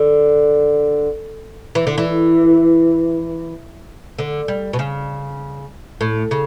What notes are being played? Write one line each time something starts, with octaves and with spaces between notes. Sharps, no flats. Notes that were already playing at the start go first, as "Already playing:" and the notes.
Already playing: D3
E3
D3
E3
D3
G3
B2
C#3
A2
C#3